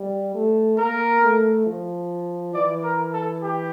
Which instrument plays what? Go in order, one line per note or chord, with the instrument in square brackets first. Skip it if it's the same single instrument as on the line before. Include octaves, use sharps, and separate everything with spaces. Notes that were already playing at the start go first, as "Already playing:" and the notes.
Already playing: [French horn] G3
A3
[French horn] A#3 [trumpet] A#4
[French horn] A3
F3
[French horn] E3 [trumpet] D5
[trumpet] A#4
A4
G4